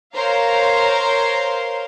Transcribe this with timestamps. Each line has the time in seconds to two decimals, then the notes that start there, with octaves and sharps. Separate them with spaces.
0.14 A#4 C5 C#5 F5 A#5